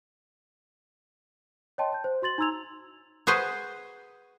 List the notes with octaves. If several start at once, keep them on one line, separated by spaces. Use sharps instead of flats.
C#5 D#5 G5 A5 C6
A5 G6
C5
F#4 C6 A6 F#7
D#4 A#5 C6 E6 G#6 F7
F#4 G#4 B4 C5